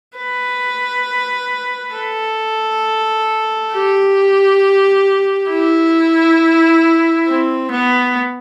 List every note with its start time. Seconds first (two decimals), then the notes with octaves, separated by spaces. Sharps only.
0.17 B4
1.94 A4
3.73 G4
5.50 E4
7.27 C4
7.71 B3